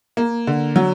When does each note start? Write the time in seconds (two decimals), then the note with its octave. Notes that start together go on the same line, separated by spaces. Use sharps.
0.17 A#3
0.47 D3
0.76 F#3